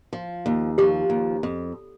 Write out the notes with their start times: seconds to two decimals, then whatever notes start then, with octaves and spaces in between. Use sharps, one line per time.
0.13 F3
0.46 D#2
0.78 F3 G4
1.10 D#2
1.43 F2